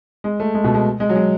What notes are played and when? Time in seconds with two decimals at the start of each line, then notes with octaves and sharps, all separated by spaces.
0.24 G#3
0.40 A3
0.54 G#3
0.64 B2
0.74 G#3
1.00 G#3
1.09 F#3
1.16 G#3